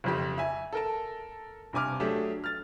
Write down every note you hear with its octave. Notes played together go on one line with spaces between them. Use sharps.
F#1 F2 G4
E5 G#5
A4 A#4 A5
G2 C3 G#5 D6 F6
F#3 A3 D4 G4 G#4
F6 A6